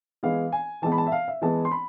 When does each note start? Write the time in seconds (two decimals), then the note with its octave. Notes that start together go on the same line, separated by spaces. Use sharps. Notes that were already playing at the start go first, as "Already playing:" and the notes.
0.23 E3 G#3 B3 F5
0.52 G#5
0.82 E3 G#3 B3 A5
0.92 B5
0.98 A5
1.07 E5
1.12 F5
1.28 E5
1.42 E3 G#3 B3 A5
1.65 C6
1.71 B5